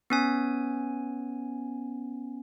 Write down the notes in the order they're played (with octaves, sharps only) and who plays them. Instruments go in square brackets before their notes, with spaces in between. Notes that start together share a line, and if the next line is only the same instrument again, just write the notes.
[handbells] B3 C#4 G#5